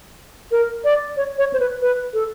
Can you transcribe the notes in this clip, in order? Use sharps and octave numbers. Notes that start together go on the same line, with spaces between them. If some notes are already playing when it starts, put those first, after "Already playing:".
A#4
D5
C#5
C#5
C5
B4
B4
A4